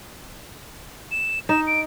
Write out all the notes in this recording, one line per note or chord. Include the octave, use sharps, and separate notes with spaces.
E7
D#4 E7
D7